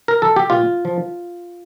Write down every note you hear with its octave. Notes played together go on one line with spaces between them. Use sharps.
A#4
A4
G4
A#2 F4
F3